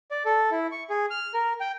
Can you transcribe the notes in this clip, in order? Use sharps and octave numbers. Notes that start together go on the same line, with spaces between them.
D5
A4
E4
C#6
G#4
F6
A#4
G5